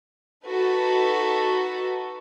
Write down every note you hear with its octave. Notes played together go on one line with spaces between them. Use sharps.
D#4 F#4 A4 B4